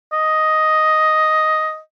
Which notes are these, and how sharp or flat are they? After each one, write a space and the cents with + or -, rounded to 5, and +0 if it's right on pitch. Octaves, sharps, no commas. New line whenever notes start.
D#5 +5